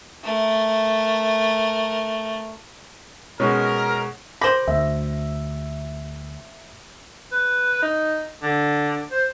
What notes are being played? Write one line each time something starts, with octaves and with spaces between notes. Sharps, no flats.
A3 A#4
B2 G#3 C#4 A#4
C5 B5 D6 A#6
D2 E5
B4
D#4
D3
C5